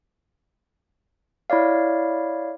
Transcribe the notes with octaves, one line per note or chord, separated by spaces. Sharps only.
E4 C#5 D5 F5